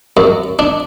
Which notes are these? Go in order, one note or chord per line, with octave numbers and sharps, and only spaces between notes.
F#2
D4